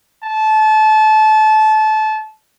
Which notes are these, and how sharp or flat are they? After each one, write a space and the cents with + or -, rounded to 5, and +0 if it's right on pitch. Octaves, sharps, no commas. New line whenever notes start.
A5 -25